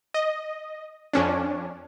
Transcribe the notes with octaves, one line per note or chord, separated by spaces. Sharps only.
D#5
F2 C#4 D4